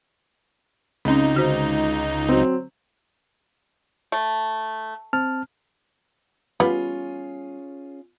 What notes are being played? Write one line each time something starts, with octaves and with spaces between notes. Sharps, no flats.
C#2 C4 C#4 D#4
D3 F#4 C5
F#3 C4
A3
C4 A5 F6
G3 B3 C#4 F4 G#4